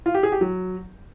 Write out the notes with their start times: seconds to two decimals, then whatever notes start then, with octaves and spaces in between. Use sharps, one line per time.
0.06 F4
0.15 G4
0.23 G#4
0.32 G4
0.41 F#3